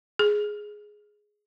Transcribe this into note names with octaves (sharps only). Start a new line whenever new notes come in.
G#4